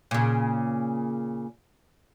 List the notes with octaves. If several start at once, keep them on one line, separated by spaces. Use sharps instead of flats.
A#2 C#3